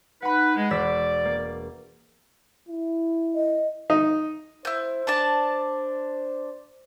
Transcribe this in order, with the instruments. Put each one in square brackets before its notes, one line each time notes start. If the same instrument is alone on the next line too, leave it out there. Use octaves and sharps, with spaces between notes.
[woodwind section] D#4 B4 [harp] F#5 B5
[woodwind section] G#3
[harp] E1 E6 B6 [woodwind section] D5
[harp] A#3
[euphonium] E4
[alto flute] D#5
[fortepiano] D#4
[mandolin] E4 G6 [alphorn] C5
[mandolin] D4 D5 A5